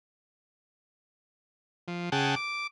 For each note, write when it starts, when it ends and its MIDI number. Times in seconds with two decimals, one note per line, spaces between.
1.88 2.10 53
2.12 2.35 49
2.12 2.35 68
2.12 2.35 78
2.12 2.35 79
2.12 2.35 81
2.36 2.67 86